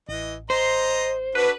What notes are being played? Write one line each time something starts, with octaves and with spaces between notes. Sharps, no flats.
A1 E3 D#5
C5 D#5 A#5 C6
D4 F#4 A4 B4